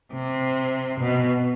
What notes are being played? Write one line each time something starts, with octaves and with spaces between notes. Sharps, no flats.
C3
B2